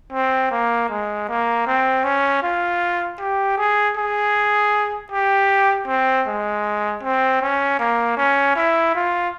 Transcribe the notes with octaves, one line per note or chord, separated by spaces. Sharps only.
C4
A#3
G#3
A#3
C4
C#4
F4
G4
G#4
G#4
G4
C4
G#3
C4
C#4
A#3
C#4
E4
F4